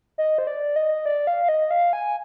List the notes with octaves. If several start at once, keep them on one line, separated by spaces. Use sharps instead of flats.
D#5
C5
D5
D#5
D5
F5
D#5
F5
G#5